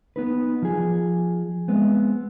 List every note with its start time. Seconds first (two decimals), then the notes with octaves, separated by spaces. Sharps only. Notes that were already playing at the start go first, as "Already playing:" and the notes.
0.16 B3 D#4 B4
0.62 F3 G#4
1.68 G#3 B3 C4